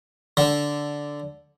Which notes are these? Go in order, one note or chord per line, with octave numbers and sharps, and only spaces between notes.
D3